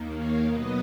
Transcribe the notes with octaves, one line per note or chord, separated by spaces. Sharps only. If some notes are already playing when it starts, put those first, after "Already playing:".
Already playing: D#2 D#3 A#3
C#5 F5
B2 F#3 B3 B4 D#5